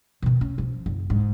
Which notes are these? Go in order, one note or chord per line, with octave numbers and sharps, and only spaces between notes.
B2 D#3
C#4
F3
F#1
G#2